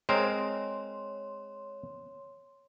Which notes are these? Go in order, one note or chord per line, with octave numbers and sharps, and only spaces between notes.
G#3 C4 A#4 C#5 C6